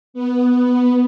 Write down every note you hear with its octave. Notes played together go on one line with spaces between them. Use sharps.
B3